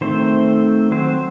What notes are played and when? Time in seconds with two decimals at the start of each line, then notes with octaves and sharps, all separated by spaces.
0.01 D#3 A3 C4 C5
0.92 F#3 C4 C5